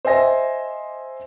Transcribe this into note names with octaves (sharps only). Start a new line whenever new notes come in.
C5 D#5 E5 G#5 A#6